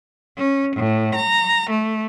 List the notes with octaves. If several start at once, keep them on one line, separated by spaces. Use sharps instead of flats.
C#4
A2
A#5
A3